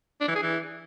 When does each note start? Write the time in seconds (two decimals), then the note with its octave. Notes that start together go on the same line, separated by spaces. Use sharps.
0.21 D4
0.28 E3
0.35 G#4
0.42 E3